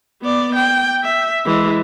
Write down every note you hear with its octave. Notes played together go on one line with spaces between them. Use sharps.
B3 D5
G5
E5
E3 G#3